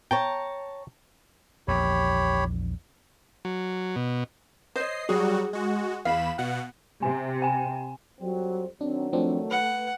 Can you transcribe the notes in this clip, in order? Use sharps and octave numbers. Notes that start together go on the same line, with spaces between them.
C#5 G5 A5 A#5
A#1 E2 G4 C#5 B5
F#3
B2
C5 C#5 D#5 C7
F#3 G3 F#4 G#4
G#3 F#4
E2 F5 B5 E7
B2 F#5
C3 G#5
G5 G#5
F2 F#3 G3 C4
D#3 F#3 C4 D4
F3 A3 C4 D4
B4 F#5